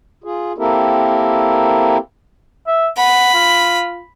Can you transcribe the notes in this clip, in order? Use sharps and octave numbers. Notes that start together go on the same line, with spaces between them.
F4 G#4
A#3 C4 E4 G4 A4 A#4
E5
F#5 B5
F4